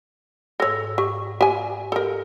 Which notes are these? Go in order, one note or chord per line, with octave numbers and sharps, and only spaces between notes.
G#2 A4 C#5 E6 A#6
G4 C#6
G4 G#5
G4 A4 A#4